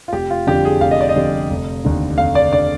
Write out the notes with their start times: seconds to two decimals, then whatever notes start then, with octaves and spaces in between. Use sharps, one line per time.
0.08 F4
0.12 F1 G4
0.30 F4
0.47 F2 D3 G3 G4
0.65 G#4
0.81 F1 F5
0.91 D#5
1.01 D5
1.09 D#5
1.16 F2 D3 G3
1.50 F1
1.85 D#2 D3
2.18 F1 F5
2.35 D5
2.53 D3 D5